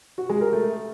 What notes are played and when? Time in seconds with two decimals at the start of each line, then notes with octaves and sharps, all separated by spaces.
0.18 F#4
0.30 G#3
0.41 A#4
0.53 A3